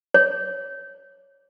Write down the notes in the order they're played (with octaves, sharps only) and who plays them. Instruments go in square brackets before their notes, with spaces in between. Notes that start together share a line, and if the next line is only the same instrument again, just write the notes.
[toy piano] C#5